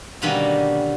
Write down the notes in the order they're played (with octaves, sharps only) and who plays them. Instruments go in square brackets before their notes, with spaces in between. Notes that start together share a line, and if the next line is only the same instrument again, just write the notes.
[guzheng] B2 D3 D#3 G3 A#3 C#4